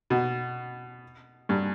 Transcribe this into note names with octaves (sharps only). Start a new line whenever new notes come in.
B2
G2